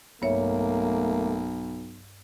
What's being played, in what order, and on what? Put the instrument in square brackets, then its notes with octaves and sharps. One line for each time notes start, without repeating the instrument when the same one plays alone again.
[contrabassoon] B1 [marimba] G2 C#5 E5 [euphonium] A3 [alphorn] A#3